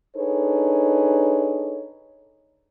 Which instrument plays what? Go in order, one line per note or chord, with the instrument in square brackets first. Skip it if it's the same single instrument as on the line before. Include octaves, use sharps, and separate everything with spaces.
[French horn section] D4 D#4 G#4 A4 B4 C#5